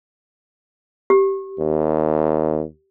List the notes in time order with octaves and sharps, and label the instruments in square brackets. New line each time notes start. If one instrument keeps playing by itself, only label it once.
[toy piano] G4
[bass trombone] D#2